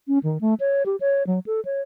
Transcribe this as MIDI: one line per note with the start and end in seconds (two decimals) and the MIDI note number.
0.08 0.19 61
0.23 0.38 51
0.41 0.54 57
0.60 0.83 73
0.86 0.96 67
1.00 1.23 73
1.27 1.39 54
1.46 1.60 69
1.65 1.81 73